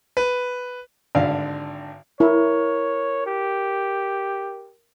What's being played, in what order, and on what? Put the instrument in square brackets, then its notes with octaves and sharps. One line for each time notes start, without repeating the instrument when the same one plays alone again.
[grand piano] B4
[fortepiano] G#1 D3 D4 F5
[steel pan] E4 [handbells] A#4 [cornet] C#5
[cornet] G4